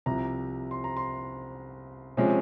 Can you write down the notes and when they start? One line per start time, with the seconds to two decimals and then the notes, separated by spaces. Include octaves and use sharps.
0.06 C2 C3 F3 A#5
0.71 C6
0.84 A#5
0.97 C6
2.17 C3 F3 G#3 C#4